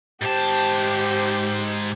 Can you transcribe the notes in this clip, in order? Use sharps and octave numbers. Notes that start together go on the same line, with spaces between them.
G#2 G4 C5 A5